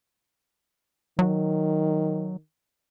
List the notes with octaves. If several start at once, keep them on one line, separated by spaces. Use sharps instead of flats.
D#3 F#3